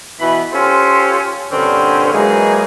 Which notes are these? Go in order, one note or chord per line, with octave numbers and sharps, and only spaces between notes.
B2 E3 B5
C#4 F4 G4 A4 C5 C6
G2 A#2 D3 C4 C#4
E3 F#3 G#3 A#3 D#4 G#4